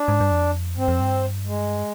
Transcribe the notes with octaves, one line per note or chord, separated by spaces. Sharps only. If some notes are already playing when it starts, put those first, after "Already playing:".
Already playing: D4
G#2
G2
F2
G2 C4
F2
G2
G#3